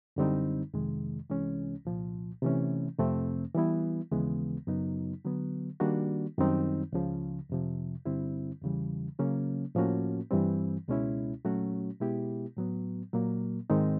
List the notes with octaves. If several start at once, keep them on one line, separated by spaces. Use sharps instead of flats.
F#2 D3 G3 C4 D#4
F2 C3 D#3 G#3
C2 C3 E3 G#3 C#4
C2 A#2 F3
C3 E3 A3 C#4
F2 C3 F3 A3 C4
E3 G3 B3 E4
D#2 C#3 E3 G#3 B3
F#2 C#3 F#3 B3 D#4
D3 F#3 B3
D#3 G3 A#3 D4 F#4
F#2 D#3 G3 C4 D#4
C#2 C#3 F3
F2 C3 F3
G2 D3 G3 C4 E4
E2 C#3 E3 G3
C#3 F#3 A#3 C#4
A2 F3 A#3 C#4 F#4
G2 E3 G3 C4
C#2 B2 G#3 C#4 E4
A#2 F#3 A3 C#4 F#4
B2 G#3 B3 E4 G4
A2 F#3 B3
A#2 F#3 A#3
G#2 D#3 G#3 C4 D#4